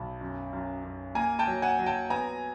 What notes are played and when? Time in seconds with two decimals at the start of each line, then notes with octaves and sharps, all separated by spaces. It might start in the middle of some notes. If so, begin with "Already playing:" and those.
Already playing: B1 A5 B5
0.21 F#2
0.53 F#2
0.84 F#2
1.15 A#3 G#5 A#5
1.39 G5 A5
1.47 F#3
1.62 F#5 G#5
1.79 F#3
1.86 G5 A5
2.10 B3 G#5 A#5